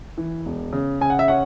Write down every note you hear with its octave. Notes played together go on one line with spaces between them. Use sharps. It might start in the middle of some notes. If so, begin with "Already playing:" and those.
E3
E1
C#3
C#3 G#5
F#5
E5
C#4 F#5